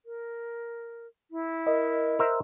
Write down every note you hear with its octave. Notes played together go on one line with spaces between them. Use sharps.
A#4
E4
A#4 D#5
A#4 C5 E5